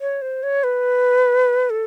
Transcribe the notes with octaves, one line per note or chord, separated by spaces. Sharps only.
C#5
C5
C#5
B4
A4